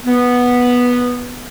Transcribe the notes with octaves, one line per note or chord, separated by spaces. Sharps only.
B3